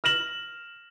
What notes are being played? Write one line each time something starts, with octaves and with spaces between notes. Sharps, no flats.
F6 A#6 E7 F#7